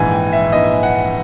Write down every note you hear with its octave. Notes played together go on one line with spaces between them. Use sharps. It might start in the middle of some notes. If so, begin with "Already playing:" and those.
Already playing: A#1 G#2 E3 G#5
G5
E5
A#1 G#2 E3 D#5
F#5